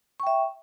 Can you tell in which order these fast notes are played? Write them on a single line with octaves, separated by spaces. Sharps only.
C#6 G5 E5